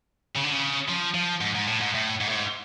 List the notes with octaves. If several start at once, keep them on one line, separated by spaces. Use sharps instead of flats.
C#3
D3
C#3
F3
F3
G#2
G#2
A2
G#2
A2
G#2
A2
G#2